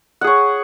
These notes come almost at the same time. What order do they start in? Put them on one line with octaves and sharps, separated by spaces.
F#5 G#4 C#5